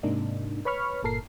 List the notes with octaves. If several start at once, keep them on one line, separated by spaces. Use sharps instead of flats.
G#2 C3 A#3 D4 D#4
B4 C#5 B5 C#6 F6
G1 A#2 A4 A#4 C7